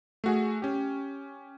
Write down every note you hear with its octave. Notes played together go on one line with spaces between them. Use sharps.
A3 F#4 G#4
C#4 G4